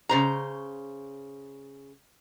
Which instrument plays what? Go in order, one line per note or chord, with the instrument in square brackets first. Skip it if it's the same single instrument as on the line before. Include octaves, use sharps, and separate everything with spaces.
[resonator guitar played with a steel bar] C#3 C5 A#5